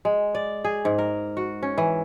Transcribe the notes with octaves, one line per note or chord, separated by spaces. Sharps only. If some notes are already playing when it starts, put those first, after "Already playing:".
G#3
D5
G#4
G#2
A#4
F#4
C#4
E3